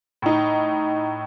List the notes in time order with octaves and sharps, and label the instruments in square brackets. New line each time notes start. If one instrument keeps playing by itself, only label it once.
[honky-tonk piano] A2 D#4